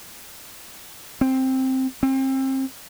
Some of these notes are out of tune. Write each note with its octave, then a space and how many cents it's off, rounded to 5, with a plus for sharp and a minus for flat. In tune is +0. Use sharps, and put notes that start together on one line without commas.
C4 +5
C4 +30